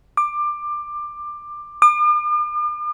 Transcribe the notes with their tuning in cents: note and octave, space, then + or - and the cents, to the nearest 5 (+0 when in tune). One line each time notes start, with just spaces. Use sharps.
D6 +20
D6 +45